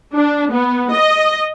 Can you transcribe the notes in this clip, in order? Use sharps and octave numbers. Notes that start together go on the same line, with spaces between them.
D4
B3
D#5